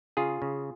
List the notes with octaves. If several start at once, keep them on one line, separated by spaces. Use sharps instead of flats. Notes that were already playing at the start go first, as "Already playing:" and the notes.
C#3 F4 G#4
C#3